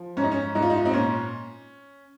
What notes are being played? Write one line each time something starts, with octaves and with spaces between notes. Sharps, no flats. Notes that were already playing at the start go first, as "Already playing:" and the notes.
Already playing: F3
G#2 C#4
D#4
C#4
G#2 D#4
F4
D#4
F4
C4 D#4
A#2 C#4